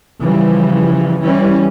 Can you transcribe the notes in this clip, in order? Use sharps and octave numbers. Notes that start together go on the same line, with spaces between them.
C#3 E3 F3 G3
E3 G3 C#4